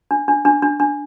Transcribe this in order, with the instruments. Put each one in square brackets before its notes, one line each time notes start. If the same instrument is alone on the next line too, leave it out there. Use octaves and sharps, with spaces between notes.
[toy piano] D4
D4
D4
D4
D4